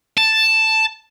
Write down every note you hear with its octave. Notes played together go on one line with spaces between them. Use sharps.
A5